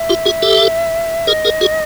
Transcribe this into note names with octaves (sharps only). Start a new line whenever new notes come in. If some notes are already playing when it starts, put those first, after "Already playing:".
Already playing: E5
F4 G4
F#4 G#4
G4 A4
G#4 A#4 D#5
G#4 A#4
F#4 G#4